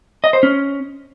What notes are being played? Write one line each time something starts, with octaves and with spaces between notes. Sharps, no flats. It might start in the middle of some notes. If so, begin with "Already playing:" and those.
D#5
C5
C#4